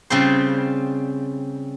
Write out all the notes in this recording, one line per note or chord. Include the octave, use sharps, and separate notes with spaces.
C#3 G3 C4 F4 G#4 C5